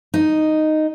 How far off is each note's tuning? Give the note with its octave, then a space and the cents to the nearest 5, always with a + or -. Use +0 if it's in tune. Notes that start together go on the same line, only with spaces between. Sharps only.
D#4 -5